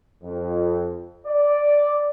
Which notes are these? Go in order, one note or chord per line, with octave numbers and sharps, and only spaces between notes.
F2
D5